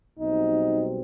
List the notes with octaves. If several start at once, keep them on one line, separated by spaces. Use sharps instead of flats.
B1 B2 G3 C4 D#4